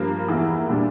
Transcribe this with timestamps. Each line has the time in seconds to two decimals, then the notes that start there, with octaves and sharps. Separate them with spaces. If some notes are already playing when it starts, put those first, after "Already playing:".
Already playing: G2 F3 A#3
0.28 E2 E3 A#3 E4
0.69 A#2 G3 D4